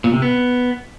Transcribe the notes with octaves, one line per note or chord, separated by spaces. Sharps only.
A#2
C3
B3